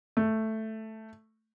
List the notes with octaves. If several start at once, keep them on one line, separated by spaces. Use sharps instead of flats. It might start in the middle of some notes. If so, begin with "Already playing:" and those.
A3